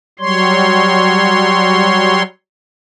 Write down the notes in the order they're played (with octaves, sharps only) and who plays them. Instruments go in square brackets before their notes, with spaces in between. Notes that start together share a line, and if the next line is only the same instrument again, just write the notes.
[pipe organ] F#3 G3 C#5 C6